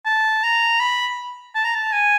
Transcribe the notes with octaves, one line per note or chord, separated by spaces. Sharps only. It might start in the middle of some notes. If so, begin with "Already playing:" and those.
A5
A#5
B5
A5
A#5
A5
G#5